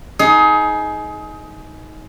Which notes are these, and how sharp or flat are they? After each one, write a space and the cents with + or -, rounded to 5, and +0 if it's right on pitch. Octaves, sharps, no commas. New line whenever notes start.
D#4 +15 G#4 +25